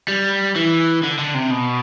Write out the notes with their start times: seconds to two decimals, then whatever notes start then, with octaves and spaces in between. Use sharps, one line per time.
0.08 G3
0.56 E3
1.03 D3
1.19 D3
1.34 C3
1.51 B2